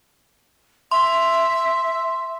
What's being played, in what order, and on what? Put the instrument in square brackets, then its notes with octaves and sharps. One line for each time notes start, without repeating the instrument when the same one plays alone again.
[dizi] E5 [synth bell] C6